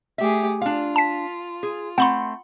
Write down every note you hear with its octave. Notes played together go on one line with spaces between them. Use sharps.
A3 G4 G#4 E5
D4 F4 F5
A5 B6
G#4
A3 C4 F#5 B5 C6